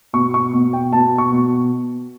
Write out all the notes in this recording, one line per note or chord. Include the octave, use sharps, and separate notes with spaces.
B2 C#6
C#6
B2
G5
B2 A5
C#6
B2